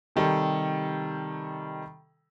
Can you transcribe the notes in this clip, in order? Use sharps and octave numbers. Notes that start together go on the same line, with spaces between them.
C3 D#3 G3 A4